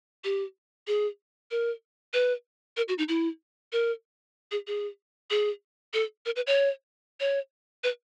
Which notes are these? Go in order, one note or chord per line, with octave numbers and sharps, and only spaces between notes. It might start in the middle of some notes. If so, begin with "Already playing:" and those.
G4
G#4
A#4
B4
A#4
F#4
D#4
E4
A#4
G#4
G#4
G#4
A4
A#4
B4
C#5
C#5
B4